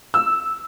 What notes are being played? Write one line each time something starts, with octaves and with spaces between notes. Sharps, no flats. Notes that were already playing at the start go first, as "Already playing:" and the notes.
E6